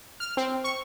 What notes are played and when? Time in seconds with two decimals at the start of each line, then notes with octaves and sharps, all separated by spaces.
0.20 F6
0.37 C4
0.64 C#6